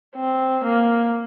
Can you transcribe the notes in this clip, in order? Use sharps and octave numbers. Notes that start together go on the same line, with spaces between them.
C4
A#3